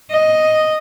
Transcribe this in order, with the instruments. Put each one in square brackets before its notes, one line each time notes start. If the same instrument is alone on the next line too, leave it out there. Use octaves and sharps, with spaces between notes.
[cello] D#5